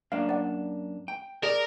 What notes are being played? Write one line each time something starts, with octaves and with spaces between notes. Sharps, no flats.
F#2 A#3 D4 F5
D5 F#5
G5
G#4 A#4 D5